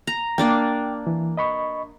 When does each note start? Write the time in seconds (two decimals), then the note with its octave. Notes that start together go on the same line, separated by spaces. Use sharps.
0.07 A#5
0.38 A#3 D4 D5 G5
1.07 E3
1.37 D#5 B5 C#6